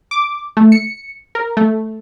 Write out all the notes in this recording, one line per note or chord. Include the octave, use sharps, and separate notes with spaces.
D6
A3
C#7
A#4
A3